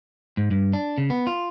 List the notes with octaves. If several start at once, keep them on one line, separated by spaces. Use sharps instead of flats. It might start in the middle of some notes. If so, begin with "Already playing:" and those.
G#2
G2
D4
C#3
B3
F4